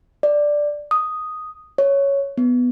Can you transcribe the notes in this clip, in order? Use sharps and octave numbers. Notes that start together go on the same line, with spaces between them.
D5
D#6
C#5
B3